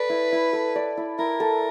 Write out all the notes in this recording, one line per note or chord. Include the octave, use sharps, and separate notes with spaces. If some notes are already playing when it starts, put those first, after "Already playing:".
Already playing: A4 B4 D5
E4
E4
A4
D5
E4
E4 A#4
A4